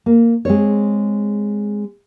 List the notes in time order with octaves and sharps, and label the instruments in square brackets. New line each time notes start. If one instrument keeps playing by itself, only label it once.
[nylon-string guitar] A#3
G#3 C4 C#5